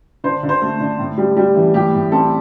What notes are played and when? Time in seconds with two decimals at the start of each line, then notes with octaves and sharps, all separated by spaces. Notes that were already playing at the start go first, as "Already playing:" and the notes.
0.24 D3 C5
0.43 D3
0.49 C5
0.62 A3
0.80 D3
0.99 A2
1.18 G3
1.37 G3
1.55 E3
1.74 A2 G4
1.93 A2
2.12 C4 A4